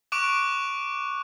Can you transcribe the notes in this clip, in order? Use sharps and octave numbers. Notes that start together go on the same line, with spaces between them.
C#6 D6 F#6 D7 F7